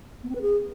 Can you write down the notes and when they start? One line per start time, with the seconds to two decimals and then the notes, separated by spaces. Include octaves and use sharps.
0.23 B3
0.29 C4
0.35 B4
0.42 G#4